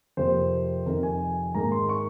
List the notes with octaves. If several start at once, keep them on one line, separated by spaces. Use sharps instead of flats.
F2 C3 F3 A#3 C5
F2 C3 D#3 A#4
G#5
G#2 D#3 A#3 A#5
C6
C#6